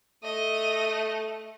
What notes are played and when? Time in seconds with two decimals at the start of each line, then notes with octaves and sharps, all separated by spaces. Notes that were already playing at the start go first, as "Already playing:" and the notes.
0.24 A3 D#5